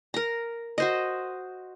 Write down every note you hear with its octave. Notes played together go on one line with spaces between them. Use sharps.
A#4 A#5
F#4 C5 D#5